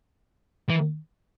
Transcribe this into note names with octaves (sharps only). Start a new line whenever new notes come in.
E3